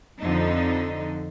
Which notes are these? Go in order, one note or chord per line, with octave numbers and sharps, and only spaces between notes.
F2 D3 F3 D#4